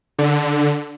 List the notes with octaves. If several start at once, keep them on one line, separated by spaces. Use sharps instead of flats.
D3